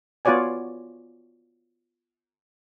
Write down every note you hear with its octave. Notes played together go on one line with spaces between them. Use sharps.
B3 F4 F#4 C#5 D5 G#5